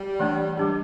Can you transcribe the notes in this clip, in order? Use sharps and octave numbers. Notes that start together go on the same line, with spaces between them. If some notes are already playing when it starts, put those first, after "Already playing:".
Already playing: G3
E3 A3 D4
G3 D4 G4